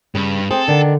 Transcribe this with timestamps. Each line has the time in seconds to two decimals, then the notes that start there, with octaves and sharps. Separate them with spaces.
0.15 G2 C#3
0.51 C4 G#4 A4 C5
0.68 D3 D#3 D4